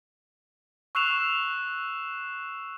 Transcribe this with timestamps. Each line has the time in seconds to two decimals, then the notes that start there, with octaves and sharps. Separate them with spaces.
0.95 C#6 E6 F#6 C7 E7 F7